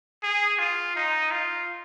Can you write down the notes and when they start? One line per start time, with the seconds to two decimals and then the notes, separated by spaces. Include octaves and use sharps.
0.23 G#4
0.59 F4
0.96 D#4
1.31 F4